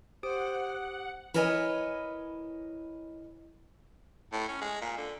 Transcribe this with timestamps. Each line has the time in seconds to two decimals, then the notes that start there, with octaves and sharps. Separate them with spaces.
0.23 G4 C5 F#5 D#6 D7
1.34 E4 A#4 B4 C#5 D#5 G#5
4.32 A2
4.48 C#4
4.61 G#3
4.81 A#2
4.98 D3